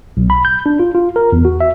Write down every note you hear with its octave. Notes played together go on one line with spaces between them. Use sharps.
B1
B5
G6
D4
F4
F4
A#4
E2
F#4
E5